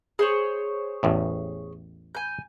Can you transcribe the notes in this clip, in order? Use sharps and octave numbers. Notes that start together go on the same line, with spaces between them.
G#4 C5 C#5
A1 E2 A2
G#5 G6